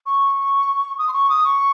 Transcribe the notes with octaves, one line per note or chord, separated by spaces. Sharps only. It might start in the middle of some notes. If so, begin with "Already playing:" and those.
C#6
D#6
C6
C#6
D#6
C#6